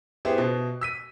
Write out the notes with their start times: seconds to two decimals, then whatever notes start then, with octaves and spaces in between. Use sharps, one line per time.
0.25 B3 E4 G4 G#4 C5
0.38 B2
0.81 E6 B6 D#7